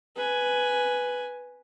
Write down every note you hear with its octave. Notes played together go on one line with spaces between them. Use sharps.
B4 G#5